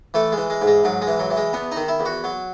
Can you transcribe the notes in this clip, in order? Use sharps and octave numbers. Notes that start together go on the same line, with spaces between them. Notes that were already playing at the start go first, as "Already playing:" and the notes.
E3 A3
G#3
E3
G#3
G#2
G#3
G#2 F#3
G#3
E3
F#3
E3
G#3
E2 B3
D#3 D#4
E4
E2
F#4
F#3